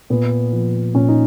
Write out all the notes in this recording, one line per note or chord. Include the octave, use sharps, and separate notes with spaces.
A#2 B3
F3
A#2 C#4
D#4